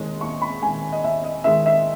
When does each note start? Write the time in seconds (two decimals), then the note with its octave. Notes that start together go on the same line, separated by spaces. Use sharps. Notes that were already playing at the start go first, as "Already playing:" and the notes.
Already playing: D#2 D#3 G#3
0.21 D#2 C#6
0.42 B5
0.62 D#3 G#3 G#5
0.92 D#5
1.04 D#2 E5
1.24 D#5
1.44 D#3 G#3 E5
1.66 E5